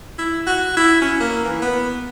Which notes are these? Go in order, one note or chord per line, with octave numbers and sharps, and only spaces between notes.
E4
F#4
E4
C#4
A#3
E3
B3